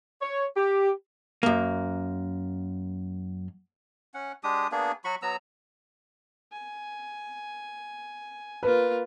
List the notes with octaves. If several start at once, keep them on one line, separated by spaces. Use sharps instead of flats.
C#5
G4
F#2 A#3
C#4 F#5
G#3 D4 G4 D#6
A#3 B3 D4 G#4
F#3 F#4 B5 C#6
F#3 B3 A#5 E6
G#5
A#3 F4 B4